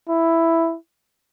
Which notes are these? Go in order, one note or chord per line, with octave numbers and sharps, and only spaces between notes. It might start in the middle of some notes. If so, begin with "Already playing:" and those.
E4